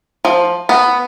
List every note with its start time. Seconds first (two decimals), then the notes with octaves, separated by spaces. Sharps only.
0.25 F3
0.69 B3